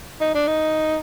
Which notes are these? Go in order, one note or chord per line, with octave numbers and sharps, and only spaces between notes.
D#4
D4
D#4